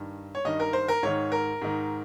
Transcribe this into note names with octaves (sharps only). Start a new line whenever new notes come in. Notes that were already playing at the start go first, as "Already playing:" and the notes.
Already playing: G2 D#3
C#5
G2 D#3 D#5
A#4
C5
A#4
G#2 D#3 C#5
A#4
G#2 D#3